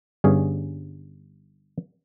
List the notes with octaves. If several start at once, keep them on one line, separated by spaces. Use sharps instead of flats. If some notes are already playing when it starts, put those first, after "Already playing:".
G1 G2 C#4 G#4